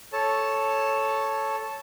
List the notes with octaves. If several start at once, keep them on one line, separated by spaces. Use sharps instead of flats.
A4 C#5 A5